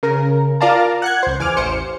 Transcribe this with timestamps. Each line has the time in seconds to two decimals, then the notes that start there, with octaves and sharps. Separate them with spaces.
0.03 C#3 A#4
0.61 F4 A#4 D5 F5 A5 A#5
1.02 F#5 F#6 G#6
1.23 C#2 C5
1.39 E2 G#5 D6 F6
1.57 A1 C5 C#7